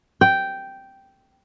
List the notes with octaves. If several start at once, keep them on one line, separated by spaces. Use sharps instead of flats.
G5